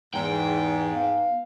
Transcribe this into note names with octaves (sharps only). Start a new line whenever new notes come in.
E2 G#2 G5
B3 F5